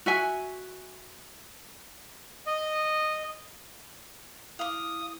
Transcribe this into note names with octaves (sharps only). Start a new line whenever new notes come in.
F#4 E5 G#5
D#5
E4 F5 D6 D#6